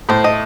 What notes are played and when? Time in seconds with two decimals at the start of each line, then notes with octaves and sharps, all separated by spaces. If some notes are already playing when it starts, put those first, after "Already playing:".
0.09 A2 C5
0.24 D#5